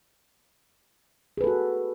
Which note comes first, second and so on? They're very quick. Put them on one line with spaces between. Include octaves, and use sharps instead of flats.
G#4 B4 A4 F#4